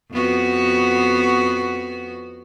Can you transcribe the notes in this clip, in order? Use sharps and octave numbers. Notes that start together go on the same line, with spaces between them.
F2 B3 F#4